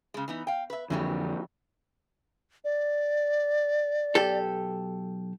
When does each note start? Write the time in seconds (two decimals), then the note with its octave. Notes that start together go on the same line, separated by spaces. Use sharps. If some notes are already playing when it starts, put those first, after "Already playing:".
0.14 C#3 G#3
0.28 E3 B3 D#4
0.47 F5 G5
0.70 B4 E5
0.90 F2 D3 E3 F#3 G3
2.64 D5
4.15 B1 G4 A4